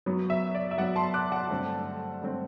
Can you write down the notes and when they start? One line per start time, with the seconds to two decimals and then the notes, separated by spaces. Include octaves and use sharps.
0.06 F#2 F#3 B3
0.30 E5
0.55 D5
0.71 E5
0.78 F#2 F#3 B3 D5 F#5
0.96 A5 C6
1.14 D6 F#6
1.32 F#5 A5
1.50 G2 D3 A3 C4
2.22 G2 D3 A3 C4